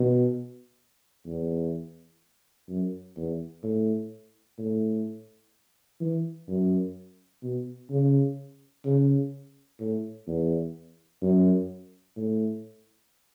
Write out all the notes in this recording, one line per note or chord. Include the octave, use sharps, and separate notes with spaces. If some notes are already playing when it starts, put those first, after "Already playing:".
Already playing: B2
E2
F#2
E2
A2
A2
E3
F#2
B2
C#3
C#3
A2
E2
F#2
A2